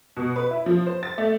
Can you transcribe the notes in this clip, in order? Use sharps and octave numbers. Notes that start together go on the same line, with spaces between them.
B2
B4
E4
F3
C5
A6
A3